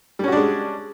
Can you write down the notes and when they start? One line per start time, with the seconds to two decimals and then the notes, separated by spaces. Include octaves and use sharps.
0.19 G3
0.24 C#4
0.28 F#4
0.32 D4
0.37 G#3